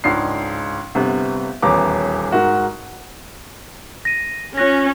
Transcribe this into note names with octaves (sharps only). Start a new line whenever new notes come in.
C#2 G#2 D4 C7
G1 C3 B3
D#1 E2 C#4 B4 A#5 D6
G#2 F#4 A#4
A#6 D#7
C#4 F4 F#6 A#6